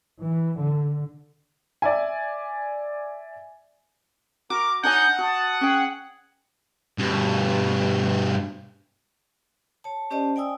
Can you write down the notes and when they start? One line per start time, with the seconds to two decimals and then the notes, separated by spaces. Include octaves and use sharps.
0.20 E3
0.59 D3
1.82 D5 E5 G#5
4.50 F#4 A#4 D6
4.83 D4 D#4 C#5 F#5 G#5 G6
5.19 F#4 A5 D#6
5.61 C#4 G#4 G5
6.98 G2 B2
9.84 C#5 A5
10.11 C#4 G4 C5 D5 D#5 A5
10.36 D5 G5 G#5 D#6 E6